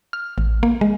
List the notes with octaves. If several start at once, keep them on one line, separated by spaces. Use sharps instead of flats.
F6
A1
A#3
G#3